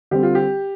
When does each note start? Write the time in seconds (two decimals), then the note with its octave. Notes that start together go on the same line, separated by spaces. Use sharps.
0.11 D3 G3 C4 G4
0.23 F4
0.35 G4